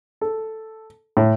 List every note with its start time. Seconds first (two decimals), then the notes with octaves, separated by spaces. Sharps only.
0.21 A4
1.17 A2